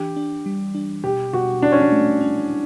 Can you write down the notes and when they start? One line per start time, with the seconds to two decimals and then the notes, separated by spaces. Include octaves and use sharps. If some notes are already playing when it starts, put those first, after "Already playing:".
Already playing: E3 D4 G4
0.16 D4
0.46 G3
0.75 D4
1.04 B2 G4
1.33 B2 F#4
1.62 D4 E4
1.72 C#4
1.81 D4
1.92 A3
2.21 C#4